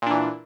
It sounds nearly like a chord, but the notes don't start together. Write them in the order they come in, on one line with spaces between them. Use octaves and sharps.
A#2 D4 E3